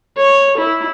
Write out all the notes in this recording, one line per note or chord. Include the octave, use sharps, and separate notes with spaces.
C#5
E4